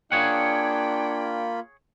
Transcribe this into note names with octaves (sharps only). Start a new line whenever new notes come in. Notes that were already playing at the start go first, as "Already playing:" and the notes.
A#3 D4 F4 G#4 C#5 F#5 G5 B5